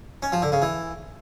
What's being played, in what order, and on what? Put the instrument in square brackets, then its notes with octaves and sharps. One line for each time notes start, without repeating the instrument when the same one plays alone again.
[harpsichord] C#4
F3
D3
C#3
E3